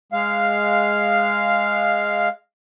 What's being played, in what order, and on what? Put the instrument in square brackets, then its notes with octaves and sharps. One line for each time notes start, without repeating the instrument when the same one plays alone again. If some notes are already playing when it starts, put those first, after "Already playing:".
[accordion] G#3 F5